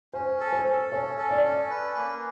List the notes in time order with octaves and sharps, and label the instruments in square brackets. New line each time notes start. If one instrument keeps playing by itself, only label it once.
[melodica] C#4 [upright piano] C5
[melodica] A4
[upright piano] C5
[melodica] A4
[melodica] C#4 [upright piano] C#5
[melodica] A4
[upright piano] D5
[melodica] C#4
B4
A#3